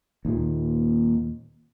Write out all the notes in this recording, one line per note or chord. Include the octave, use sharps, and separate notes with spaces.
D#2 A#2